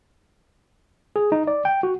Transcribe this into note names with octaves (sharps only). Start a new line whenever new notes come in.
G#4
D#4
D5
G5
F#4